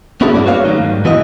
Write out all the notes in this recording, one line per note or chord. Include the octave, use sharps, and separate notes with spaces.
B3 C#4 E4 F#4 G#4 A4
G2 A#3 E4 D5
F#4 B4 C#5 F5
D#3 F#3 G3 A3 C#4 D#4
G#2
E3 B3 E4 F#4 D#5